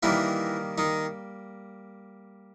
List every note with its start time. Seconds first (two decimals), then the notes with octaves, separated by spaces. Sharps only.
0.03 D#3 E3 G3 A#3 E4
0.78 D#3 D#4